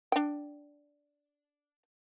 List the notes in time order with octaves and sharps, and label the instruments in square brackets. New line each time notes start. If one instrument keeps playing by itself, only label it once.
[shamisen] D4 G5